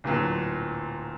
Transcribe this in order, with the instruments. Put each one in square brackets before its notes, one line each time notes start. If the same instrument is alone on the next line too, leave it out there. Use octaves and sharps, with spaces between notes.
[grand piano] D1 A#2 F#3